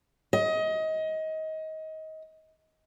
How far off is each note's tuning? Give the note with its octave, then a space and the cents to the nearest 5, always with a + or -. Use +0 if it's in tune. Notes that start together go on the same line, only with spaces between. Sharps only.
D#5 +25